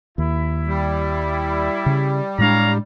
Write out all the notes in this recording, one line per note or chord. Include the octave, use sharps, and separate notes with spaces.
D#2 E4
G3
C#3
A2 G#3 D4 C#5 F5 A#5